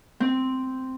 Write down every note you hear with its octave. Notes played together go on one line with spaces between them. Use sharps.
C4